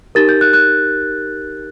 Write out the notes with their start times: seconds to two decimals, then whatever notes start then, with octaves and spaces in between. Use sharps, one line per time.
0.15 D#4 G4 A#4 A6
0.29 G6
0.41 F#6
0.53 F#6